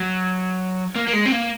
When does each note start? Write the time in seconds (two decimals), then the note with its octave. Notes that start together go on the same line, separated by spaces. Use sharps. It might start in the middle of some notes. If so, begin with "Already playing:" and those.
Already playing: F#3
0.96 A#3
1.08 A#3
1.13 G#3
1.26 C4
1.32 A#3